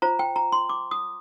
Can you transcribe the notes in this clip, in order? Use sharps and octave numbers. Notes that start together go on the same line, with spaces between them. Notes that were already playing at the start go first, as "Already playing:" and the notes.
F4 C5 A#5
G5
A#5
C6
D6
D#6